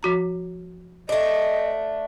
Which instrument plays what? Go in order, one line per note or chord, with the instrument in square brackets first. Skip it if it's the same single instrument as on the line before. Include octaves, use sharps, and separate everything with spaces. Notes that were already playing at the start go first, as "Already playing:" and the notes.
[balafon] F3 F#4 A#5
[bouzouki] A3 D4 [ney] D#5